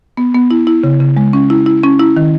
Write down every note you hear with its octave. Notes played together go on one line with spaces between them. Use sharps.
B3
B3
E4
E4
C#3
C#3
G#3
C#4
E4
E4
C#4
E4
D#3